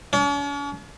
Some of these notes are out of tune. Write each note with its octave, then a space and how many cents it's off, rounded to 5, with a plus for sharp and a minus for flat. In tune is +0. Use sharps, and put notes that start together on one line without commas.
C#4 +45